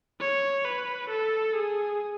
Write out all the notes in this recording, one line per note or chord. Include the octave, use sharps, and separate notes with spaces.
C#5
B4
A4
G#4